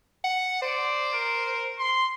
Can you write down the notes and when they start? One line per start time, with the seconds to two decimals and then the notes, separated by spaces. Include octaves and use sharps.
0.24 F#5
0.62 C5 D5
1.13 A#4
1.79 C6